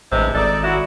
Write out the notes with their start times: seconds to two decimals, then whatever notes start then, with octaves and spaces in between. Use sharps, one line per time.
0.12 A1 G2 C3 G#3
0.35 G#1 D#4 A4 D5
0.64 F#3 E4 F#4